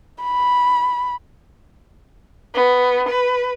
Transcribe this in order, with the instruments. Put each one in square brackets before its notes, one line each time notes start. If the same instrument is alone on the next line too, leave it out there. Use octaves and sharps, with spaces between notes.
[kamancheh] B5
[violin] B3
B4